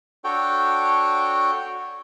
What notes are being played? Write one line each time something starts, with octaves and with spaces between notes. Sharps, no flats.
D4 F#4 A4 C#5 G5